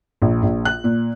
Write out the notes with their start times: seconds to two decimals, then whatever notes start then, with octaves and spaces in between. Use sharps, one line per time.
0.22 A#1
0.43 A#1
0.65 F#6
0.84 A#2